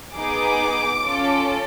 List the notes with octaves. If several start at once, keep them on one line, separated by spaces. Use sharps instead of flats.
B3 D#4 G#4 D6
C#4 F4 A4